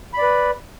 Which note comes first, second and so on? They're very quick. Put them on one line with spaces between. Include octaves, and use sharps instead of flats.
B5 D5 B4